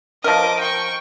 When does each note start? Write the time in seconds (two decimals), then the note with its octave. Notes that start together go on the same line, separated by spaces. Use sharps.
0.24 F3 A#4 D#5 D6
0.60 G5 C#6